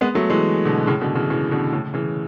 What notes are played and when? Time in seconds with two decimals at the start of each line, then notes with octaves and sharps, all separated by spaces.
0.01 G#3 B3
0.15 F#3 A3
0.30 E3 G#3
0.65 B2 D3
0.87 A2 C#3
1.01 B2 D3
1.15 C#3 E3
1.30 C#3 E3
1.51 B2 D3
1.72 A2 C#3
1.94 C#3 E3